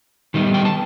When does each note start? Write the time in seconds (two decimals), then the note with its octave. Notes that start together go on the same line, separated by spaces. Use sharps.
0.34 D#3 G3 B3 D#4
0.54 G5
0.65 A5